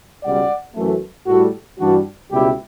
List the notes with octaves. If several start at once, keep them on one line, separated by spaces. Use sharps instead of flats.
C#2 B2 G3 D5 F#5
F#2 E3 A3
A2 G3 F#4 A4
G2 E3 G3 D4 F#4
C#2 B2 G3 E4 G4